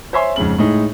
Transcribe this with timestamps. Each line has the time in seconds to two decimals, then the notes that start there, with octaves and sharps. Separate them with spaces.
0.13 C5 C#5 E5 G#5 C6
0.36 F2 G#2 C#3 F#7
0.58 A2 G#3 D#4